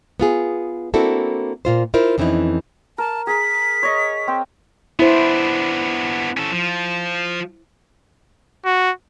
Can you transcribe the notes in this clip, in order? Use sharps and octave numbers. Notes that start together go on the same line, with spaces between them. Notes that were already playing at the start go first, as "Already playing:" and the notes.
B3 F4 G#4
A#3 C4 D4 E4 F#4 A4
A#2 F4 C5
E4 F4 A#4 C5
F2 E3 C4 C#4 D#4 E4
A#4 A5
G#4 A#4 B6
C#5 D#5
C4 G5
B3 D4 E4 C5
C#4 A4
F3
F#4